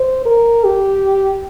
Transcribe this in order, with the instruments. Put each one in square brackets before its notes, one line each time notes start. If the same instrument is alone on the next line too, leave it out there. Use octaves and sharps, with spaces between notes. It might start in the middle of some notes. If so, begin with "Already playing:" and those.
Already playing: [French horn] C5
A#4
G4